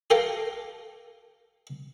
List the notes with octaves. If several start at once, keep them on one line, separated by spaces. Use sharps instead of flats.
G4 A4 A#4 F5 G5